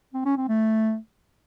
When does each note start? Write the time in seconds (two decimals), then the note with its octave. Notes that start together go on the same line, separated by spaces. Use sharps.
0.14 C4
0.25 C#4
0.37 C4
0.48 A3